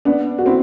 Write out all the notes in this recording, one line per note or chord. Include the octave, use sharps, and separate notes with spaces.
B3 D4
F#4
C4 E4